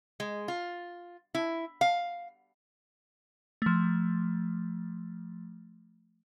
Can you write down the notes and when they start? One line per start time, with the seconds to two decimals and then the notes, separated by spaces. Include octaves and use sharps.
0.20 G#3
0.48 F4
1.35 E4
1.81 F5
3.62 F3 A3